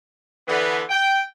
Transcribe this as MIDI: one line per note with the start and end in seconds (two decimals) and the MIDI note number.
0.48 0.82 50
0.48 0.82 52
0.48 0.82 59
0.90 1.22 79